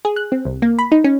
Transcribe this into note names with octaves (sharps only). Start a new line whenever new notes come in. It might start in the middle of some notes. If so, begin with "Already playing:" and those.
G#4
F#6
C4
C2
A#3
B5
D#4
C#4